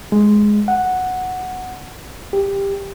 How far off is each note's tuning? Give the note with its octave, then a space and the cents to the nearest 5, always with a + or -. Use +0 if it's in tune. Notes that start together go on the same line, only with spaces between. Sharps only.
G#3 +5
F#5 -5
G4 +15